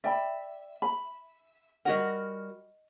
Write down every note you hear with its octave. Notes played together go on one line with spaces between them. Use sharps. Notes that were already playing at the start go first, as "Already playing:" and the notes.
D5 E5 G5 B5
B5
G3 F#4 A#4 D#5 F#5